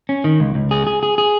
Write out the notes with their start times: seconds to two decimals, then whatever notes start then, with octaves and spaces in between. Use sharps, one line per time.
0.09 C#4
0.24 D#3
0.40 C#2
0.55 C#2
0.71 G#4
0.87 G#4
1.03 G#4
1.18 G#4